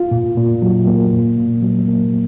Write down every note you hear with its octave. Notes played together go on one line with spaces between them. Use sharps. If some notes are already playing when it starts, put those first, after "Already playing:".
Already playing: F4
A#2
A#2
F#3
A#3
A#2
A#2
F#3
A#3